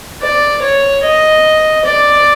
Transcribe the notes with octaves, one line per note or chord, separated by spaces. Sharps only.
D5
C#5
D#5
D5